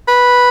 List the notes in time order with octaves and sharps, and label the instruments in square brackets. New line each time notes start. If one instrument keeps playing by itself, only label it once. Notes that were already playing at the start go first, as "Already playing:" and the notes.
[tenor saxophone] B4